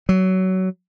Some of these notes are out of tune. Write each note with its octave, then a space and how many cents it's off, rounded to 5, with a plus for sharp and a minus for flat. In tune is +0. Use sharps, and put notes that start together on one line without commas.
F#3 +20